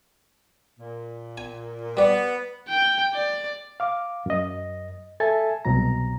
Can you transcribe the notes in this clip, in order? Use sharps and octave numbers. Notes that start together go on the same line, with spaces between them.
A#2
G#5
G3 B3 D5
G5
D5
F5 D6
F#2 D#5
A4 E5 G#5 A5
C2 B2 F#3 A#5